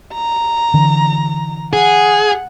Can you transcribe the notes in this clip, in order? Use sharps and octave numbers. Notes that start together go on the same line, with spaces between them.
A#5
D3 E3
G#4 F#5